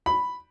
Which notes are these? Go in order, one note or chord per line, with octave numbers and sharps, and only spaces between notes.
B5